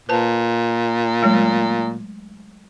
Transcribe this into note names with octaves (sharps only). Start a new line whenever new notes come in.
A#2 B4 C5 A5
F#3 G#3 A3